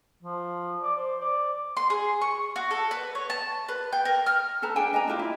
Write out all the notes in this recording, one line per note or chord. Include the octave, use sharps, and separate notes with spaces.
F3
D5
C5
D5
C6
G#4
C#6
F#4
A4
B4
C#5
A5
B4
G5
A#4
F6
A4 B4 A5 A#5
D4 G#4 G5 G#5
D4 D#5 A5 A#5
D4 E4 F4 G4
E4